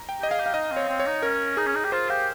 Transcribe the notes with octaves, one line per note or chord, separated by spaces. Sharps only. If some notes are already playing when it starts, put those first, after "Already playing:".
Already playing: A#5
G5
G4 D#5
G#4 F5
G4
F5
D#4 D#5
C4
C#5
C4
C#5
D#4
C#4 A#4
D#4 G#4
C#4
D#4
G4
F4 C5
G4 F5